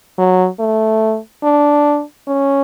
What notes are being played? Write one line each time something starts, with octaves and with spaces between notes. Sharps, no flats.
F#3
A3
D4
C#4